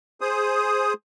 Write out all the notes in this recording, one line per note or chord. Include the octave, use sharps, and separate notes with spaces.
G#4 C5 D#6